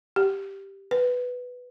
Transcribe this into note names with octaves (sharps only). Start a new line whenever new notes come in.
G4
B4